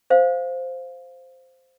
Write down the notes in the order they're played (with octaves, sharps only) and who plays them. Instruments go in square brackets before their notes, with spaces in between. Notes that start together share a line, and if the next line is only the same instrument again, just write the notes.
[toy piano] C5 F5